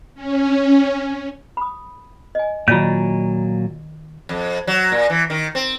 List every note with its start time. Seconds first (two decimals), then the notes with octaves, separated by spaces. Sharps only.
0.15 C#4
1.57 B5 D#6
2.35 D#5 G#5
2.68 A#2 D#3 F#3 F4 D5 F5
4.29 F2
4.67 F#3
4.92 A#2
5.10 E3
5.30 D#3
5.55 C4